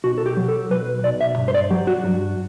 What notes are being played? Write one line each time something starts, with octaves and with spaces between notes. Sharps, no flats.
B1 F#4
A4
G4
F#3
A4
B1 B4
B1 D5
E5
G2
C5
D5
F#3 G4
F#4
G2 F#4